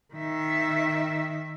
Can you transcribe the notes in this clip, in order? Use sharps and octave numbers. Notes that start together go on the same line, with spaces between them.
D#3 E5